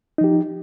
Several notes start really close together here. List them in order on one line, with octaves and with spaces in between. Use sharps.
D#4 F3 G4